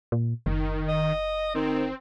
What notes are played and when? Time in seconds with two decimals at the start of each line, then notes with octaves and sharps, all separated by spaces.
0.12 A#2
0.46 F#1 D#3
0.88 D#5
1.55 D#3 C4